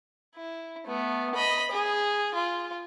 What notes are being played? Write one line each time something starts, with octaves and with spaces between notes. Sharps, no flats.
E4
A3 B3
D#5 B5
G#4
F4